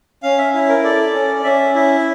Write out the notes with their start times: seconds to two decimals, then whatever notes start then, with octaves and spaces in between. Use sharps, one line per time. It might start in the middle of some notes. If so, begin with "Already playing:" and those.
0.23 C#4 F5
0.38 E5
0.54 E4 E5
0.69 A#4
0.84 A4 D5
1.14 C#4
1.44 C#4 E5
1.75 E4 E5